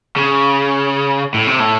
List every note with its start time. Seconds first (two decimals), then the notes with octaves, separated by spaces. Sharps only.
0.17 C#3
1.34 A2
1.47 C3
1.60 A2